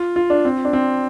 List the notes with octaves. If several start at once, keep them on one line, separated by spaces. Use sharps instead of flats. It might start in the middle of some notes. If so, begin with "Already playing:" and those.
Already playing: F4
F4
D4
C4
D4
C4